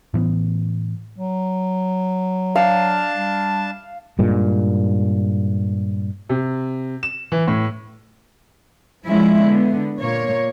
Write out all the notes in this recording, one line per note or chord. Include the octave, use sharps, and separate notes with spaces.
A2 E3 B3
F#3
D4 F5 A5
G3
G2 A#2 G#3
C3
E7
E3
A2
F3 G#3 C#4 E4
D3 B3
A#2 A#3 C#5